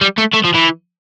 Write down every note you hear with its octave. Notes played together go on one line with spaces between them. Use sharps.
G3
A3
A3
F3
E3